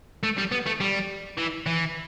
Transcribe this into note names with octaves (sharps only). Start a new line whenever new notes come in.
A3
G3
B3
A3
G3
E3
E3